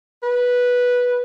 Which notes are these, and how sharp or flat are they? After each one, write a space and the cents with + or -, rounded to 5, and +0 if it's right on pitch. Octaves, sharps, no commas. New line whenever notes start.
B4 -10